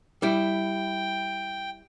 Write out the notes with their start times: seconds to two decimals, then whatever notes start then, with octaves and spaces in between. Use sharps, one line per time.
0.22 G3 E4 G5